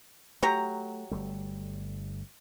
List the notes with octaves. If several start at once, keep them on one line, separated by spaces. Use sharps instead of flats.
F#3 A3 G4 A#5
G1 G3 A3